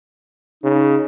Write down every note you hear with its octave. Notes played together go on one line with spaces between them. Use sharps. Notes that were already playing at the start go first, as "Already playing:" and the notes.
C#3 D#4